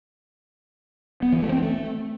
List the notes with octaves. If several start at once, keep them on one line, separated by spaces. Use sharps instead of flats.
B3
E3
A3
C4
A3